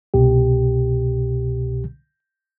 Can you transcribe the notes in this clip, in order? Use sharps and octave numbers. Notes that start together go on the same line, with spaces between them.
C2 B2 G4